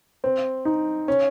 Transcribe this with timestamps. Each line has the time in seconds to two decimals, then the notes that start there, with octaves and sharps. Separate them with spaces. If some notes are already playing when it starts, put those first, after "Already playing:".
0.24 C4
0.65 D#4
1.08 C#4